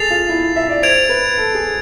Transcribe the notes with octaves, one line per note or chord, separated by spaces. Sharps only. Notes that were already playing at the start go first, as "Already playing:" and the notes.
Already playing: G#4 A4 A6 C7 F7
F4
E4
E5
D5
C5 G#6 D7 F7
B4
A4
G#4